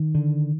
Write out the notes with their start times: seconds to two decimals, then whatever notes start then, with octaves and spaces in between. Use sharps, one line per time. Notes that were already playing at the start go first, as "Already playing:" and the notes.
Already playing: D#3
0.15 D3